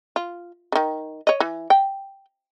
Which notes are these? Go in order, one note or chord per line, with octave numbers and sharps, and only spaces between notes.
F4
D3 D#3
C#5 D#5
E3
G5